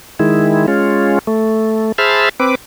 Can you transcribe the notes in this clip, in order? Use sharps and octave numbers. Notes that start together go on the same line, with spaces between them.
D#3 G#3 E4
G#3 C#4 F4
A3
G#4 C5 E5 A5 B5 F6
C4 B4 D6